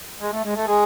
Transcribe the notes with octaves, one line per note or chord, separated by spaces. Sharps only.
G#3
A3
G#3
A3
G#3